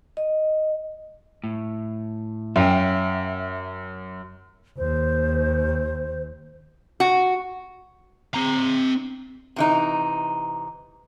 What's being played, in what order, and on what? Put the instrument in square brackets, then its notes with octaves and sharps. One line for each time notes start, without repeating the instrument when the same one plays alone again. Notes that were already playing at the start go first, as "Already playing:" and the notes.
[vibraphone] D#5
[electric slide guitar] A2
[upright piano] F#2 [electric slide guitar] E5 F5 G5
[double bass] D#2 [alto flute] C5
[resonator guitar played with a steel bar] F#4
[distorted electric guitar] C4 A#5
[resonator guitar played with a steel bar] C3 E3 D#4